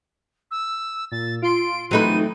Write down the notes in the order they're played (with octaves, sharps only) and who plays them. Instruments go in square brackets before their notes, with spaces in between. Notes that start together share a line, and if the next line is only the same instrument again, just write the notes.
[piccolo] E6
[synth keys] A#2 [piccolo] A6
[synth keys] F4 C6 [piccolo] D7
[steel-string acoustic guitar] E3 A3 C4 [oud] F#3 D#4 B4 [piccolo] D#7